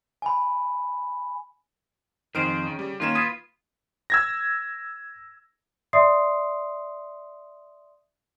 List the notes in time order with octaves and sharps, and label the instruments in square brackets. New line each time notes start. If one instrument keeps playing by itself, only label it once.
[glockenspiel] G#5 B5
[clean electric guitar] F2 G#4 C5 [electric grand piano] D#3 F6 D7
[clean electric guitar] C#3
[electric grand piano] G3
[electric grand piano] D#3 A#3 E7 [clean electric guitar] C#4 F4
[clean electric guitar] F4 B4 [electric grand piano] D#6 G#6
[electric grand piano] E6 G#6 A#6
[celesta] D5 E5 C6 D#6 C7